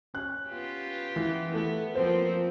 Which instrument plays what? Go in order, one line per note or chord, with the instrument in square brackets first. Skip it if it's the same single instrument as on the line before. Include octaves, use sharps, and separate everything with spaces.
[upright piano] C#4 F#6
[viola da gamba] B3 F4 G4
[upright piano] E3
[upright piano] A3 A4 [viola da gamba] B3
[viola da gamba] F3 C4 [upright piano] A#3 C5